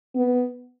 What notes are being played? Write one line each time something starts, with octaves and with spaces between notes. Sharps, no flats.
B3